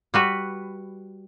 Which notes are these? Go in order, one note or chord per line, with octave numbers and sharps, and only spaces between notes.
G3 F#4 B4